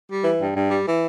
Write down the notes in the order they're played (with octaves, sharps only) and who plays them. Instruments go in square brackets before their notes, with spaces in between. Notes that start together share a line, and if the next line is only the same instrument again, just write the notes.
[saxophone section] G3
E3
G2
G2
G3
E3